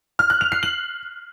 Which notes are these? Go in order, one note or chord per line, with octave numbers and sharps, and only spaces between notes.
F6
F#6
F7
C7
F#7